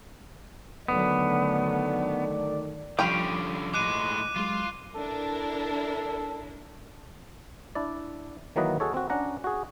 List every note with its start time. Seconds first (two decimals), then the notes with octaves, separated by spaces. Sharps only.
0.88 D3 D#3 F#3 A3 B3 A4 D5
2.99 D3 F3 G3 C#4 F4 G4 G5 B5
3.74 A2 G#3 D6 F#6 D#7
4.36 F#3 G#3 F4
4.95 D4 E4 A4 A#4
7.75 D4 E4 D5
8.56 D#3 E3 F#3 A#3 B4 D#5
8.80 F#4 G#4 A4 C#5
8.94 C4 F#4
9.10 C#4 D4 F#5 A#5
9.44 F#4 G#4